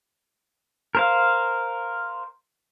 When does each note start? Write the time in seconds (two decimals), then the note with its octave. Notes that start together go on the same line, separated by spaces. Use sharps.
0.95 A#4 C5 F5